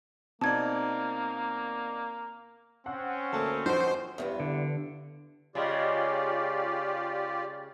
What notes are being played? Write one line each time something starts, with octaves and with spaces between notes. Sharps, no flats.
B2 A#3 C4 D#4 D5 A5 G#6
C4 C#4 F#5
D2 A3 A#3 A5
F3 D#4 F#4 C5 G5 C#6
E2 G2 B3
D3
C#3 G#3 F4 G4 D5